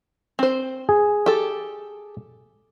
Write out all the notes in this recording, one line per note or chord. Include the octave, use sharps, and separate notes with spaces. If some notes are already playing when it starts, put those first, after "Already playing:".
C4 C5
G#4
G4 A4